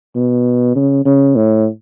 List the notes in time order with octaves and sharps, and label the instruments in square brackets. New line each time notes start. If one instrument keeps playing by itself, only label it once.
[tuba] B2
C#3
C#3
A2